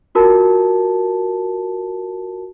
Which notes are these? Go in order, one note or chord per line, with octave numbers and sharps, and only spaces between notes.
F4 F#4 A#4 A5